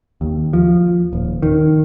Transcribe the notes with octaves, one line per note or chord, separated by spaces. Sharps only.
D#2
F3
D#1
D#3